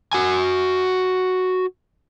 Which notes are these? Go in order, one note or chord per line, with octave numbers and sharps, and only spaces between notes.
F#4 G#5